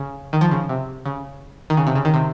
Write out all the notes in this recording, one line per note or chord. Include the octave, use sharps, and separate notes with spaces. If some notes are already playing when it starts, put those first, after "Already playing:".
Already playing: C#3
D#3
F3
C#3
C3
C#3
D#3
C#3
C3
C#3
D#3
C3